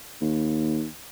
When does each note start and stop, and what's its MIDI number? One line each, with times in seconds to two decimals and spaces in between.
0.22 0.86 39